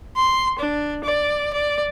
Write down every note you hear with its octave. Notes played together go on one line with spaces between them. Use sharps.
C6
D4
D5
D5